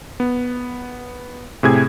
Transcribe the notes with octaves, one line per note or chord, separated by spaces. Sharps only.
B3
A2 C3 G#4 G#6